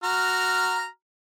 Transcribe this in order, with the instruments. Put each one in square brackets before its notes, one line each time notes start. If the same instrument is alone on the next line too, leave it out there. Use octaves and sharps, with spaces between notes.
[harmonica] F#4 A#5 F6